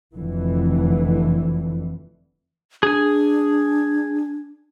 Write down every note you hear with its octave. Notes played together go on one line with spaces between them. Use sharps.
F1 F2 D3 E3
D4 G#4 G#5